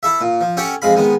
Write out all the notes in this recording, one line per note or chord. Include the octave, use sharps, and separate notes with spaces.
E4 A4 E5
A#2
F3
C#4 G4 A4 C#5 F#5 G5
F2 G#3 F5 B5
D#3 G#3 B3